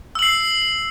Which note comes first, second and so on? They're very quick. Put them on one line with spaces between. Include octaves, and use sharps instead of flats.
E6 F#7 C7